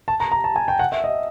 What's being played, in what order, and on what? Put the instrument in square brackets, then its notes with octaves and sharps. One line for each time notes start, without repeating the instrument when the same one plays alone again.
[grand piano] A5
A#5
A#5
A5
G#5
G5
F#5
E5
D#5